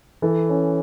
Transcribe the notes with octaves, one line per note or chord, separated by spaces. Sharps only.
E3 A4
C#4